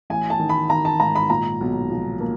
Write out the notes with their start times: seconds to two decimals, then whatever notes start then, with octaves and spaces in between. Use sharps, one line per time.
0.10 A1 G#5
0.30 A5
0.39 D#3
0.49 B5
0.70 D#3 A#5
0.85 A5
1.00 G#2 A#5
1.15 B5
1.30 A#2 A#5
1.61 B1
1.90 F3
2.20 A#3